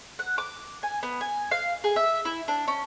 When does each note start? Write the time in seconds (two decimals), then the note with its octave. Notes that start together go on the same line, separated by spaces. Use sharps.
0.19 F#5
0.38 D6
0.83 G#5
1.03 B3
1.21 G#5
1.51 F5
1.84 G#4
1.96 E5
2.25 E4
2.48 D4
2.68 C#4